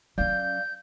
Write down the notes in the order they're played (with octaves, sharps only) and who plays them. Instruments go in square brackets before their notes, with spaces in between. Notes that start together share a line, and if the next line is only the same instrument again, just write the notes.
[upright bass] F#3 C#4 [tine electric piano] D5 F5 [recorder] G6